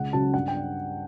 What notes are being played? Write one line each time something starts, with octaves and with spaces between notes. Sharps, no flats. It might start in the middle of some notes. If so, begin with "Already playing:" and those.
Already playing: C#2 F#5
C#3 F#3 C#4 A5
G2 F#5
G5
D4